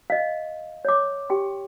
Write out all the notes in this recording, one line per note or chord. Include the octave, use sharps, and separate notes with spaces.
D#5 F5
C#5 D6
G4 G5 C6